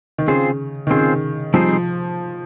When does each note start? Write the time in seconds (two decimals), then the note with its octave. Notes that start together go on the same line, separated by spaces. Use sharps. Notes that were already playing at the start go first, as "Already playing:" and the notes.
0.18 D#3
0.27 C#3 C4 F4 G#4 C5
0.87 D#3
0.90 C#3 C4 F4 G#4 C5
1.54 F3 G3 C4 D#4 G#4 C5